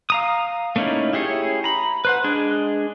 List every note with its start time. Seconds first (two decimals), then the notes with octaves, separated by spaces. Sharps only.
0.10 F5 A#5 D#6
0.76 A3 A#3 C#4 D#4 E4
1.13 E4 G4 G#4 C#5
1.64 A#5 B5
2.05 B4 C5 F#5
2.24 G#3 D4 G#4